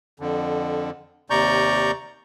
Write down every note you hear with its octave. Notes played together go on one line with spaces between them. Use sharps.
F2 D3
D#2 C3 D5 A#5 C#6 G6